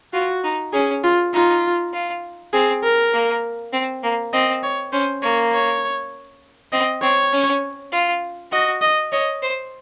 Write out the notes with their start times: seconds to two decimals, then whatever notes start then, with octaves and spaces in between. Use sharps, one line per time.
0.13 F4 F#4
0.44 D#4
0.73 C#4 G#4
1.04 F4
1.33 D#4 F4
1.93 F4
2.53 C4 G#4
2.84 A#4
3.13 A#3
3.72 C4
4.03 A#3
4.33 C4 D#5
4.63 C#5
4.92 C#4 C5
5.22 A#3 C#5
5.52 C#5
6.72 C4 D#5
7.02 C4 C#5
7.32 C#4
7.92 F4
8.51 F#4 D#5
8.82 D#5
9.12 C#5 D#5
9.42 C5